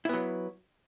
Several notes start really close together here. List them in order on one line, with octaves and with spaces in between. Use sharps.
E4 B3 F#3